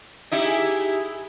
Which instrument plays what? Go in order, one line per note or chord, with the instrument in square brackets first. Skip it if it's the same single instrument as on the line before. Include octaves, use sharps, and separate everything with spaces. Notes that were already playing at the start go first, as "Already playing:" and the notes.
[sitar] D#4 E4 G4
[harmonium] G#4